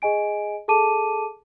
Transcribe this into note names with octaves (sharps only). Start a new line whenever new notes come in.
G#4 D#5 G#5 D7
G#4 A4 A5 D6 D#7